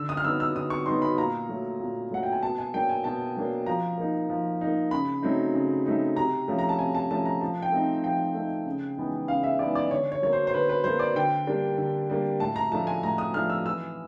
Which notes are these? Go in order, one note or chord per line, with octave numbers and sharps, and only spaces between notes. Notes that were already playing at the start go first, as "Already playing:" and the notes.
Already playing: D3 E6
D#6
F6
F#3 B3 D#4 E6
E6
D3 D#6
C#6
F#3 B3 D#4 C6
B5
A#2 A#5
F#3 A3
A#2
F#3 A3 F#5
G5
G#5
B2 A5
G#5
F#3 A#3 D4 G5
G#5
B2 A5
F#3 A#3 D4
F3 A#5
A#3 D#4
F3
A#3 D#4
C#3 B5
F#3 A3 C4 D#4
C#3
F#3 A3 C4 D#4
C3 A#5
F3 A3 C#4
A#5
A5
C3 G#5
A5
F3 A3 C#4 A5
A#5
F3 A5
G5
A3 C4 D#4
F3 G5
A3 C4 D#4
C#3
E3 G#3 B3 D#4
C#3 F5
E5
E3 G#3 B3 D#4 D5
D5
D3 C#5
C#5
F#3 A#3 C#5
C5
C5
D3 B4
B4
F#3 A#3 C5
D5
D3 G5
G3 A#3 D4
D3
G3 A#3 D4
A2 A5
A#5
F3 A3 D4 A5
G#5
A2 A#5
D#6
F3 A3 D4 F6
E6
E3 E6